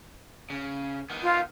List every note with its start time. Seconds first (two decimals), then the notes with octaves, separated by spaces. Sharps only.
0.50 C#3
1.10 D#3 B3
1.23 F4